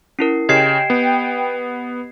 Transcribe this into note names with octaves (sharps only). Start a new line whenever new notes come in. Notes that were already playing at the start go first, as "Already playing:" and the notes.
C#4 E4 A#4 C7
C#3 G4 D#5 G5 G#6 C7 E7
B3